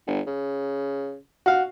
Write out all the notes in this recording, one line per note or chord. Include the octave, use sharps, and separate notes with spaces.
G1
C#3
F#4 F5